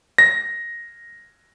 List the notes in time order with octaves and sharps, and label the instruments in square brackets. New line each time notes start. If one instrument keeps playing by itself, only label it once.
[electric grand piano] A#6